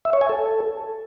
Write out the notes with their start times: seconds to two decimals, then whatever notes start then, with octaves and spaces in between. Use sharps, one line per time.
0.05 E5
0.13 C#5
0.21 G#5
0.29 A4